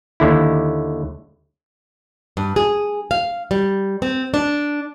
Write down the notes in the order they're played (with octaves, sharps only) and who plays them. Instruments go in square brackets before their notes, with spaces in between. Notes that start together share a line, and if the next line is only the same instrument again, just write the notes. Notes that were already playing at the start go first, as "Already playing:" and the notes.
[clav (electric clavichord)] D#2 D3 E4
[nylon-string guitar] G2
G#4
F5
G3
C4
D4